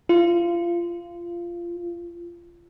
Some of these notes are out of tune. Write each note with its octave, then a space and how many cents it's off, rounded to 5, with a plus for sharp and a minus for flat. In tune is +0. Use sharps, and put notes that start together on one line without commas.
F4 -20